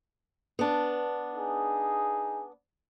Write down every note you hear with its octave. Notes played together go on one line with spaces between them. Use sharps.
B3 D4
D#4 G#4